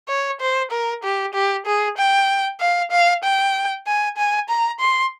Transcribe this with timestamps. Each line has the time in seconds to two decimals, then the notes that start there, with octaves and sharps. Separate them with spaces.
0.09 C#5
0.40 C5
0.71 A#4
1.03 G4
1.34 G4
1.66 G#4
1.98 G5
2.60 F5
2.91 F5
3.24 G5
3.86 G#5
4.17 G#5
4.49 A#5
4.80 C6